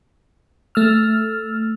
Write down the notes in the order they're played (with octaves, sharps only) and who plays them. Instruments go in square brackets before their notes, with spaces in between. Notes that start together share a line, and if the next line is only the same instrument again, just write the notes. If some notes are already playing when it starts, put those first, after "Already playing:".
[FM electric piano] A3 E6 F6